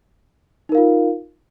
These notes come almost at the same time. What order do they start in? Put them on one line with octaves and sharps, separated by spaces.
D#4 A#4 F5 F4